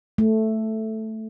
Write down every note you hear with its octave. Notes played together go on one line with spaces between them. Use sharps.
A3